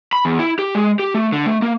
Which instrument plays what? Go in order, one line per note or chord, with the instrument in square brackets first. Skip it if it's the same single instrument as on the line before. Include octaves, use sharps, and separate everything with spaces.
[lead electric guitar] B5
E2
E4
G4
G#3
G4
A3
D3
A3
A#3